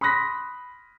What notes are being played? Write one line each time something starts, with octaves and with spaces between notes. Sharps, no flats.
B5 C6 D#6 F#6 A#6 B6